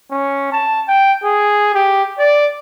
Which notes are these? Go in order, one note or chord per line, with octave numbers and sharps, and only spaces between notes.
C#4
A5
G5
G#4
G4
D5